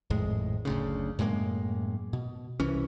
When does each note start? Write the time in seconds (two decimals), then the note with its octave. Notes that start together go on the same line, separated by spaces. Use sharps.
0.10 G#1 F2 A2 G#3
0.65 F#1 D2 C#3
1.19 F#2 A2 G#3 A#3
2.13 B2
2.60 C2 E3 C#4